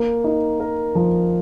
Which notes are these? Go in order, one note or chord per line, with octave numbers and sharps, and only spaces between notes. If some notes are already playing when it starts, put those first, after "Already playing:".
Already playing: A#3
D#4
A#4
F3